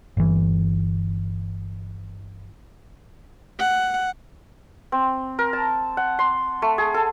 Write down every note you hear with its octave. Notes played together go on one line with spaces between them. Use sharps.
G1 E3
F#5
C4
A#4
A5
F#5
C6
A3
G#4
A4